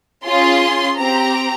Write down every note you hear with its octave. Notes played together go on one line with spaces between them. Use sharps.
C#4 F4 G#4 C6
C4 G4 A#5